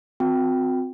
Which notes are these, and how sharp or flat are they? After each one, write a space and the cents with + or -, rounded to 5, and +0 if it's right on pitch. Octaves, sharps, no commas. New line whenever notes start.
C4 -20 F#4 -40 G5 -5